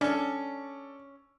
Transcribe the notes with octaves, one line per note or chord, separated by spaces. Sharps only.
C#4 D4 A4 D5